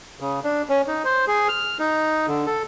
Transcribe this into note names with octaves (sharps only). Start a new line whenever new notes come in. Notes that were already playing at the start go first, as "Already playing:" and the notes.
C#3
D4
C#4
D#4
C5
G#4
F6
D#4
D3
A4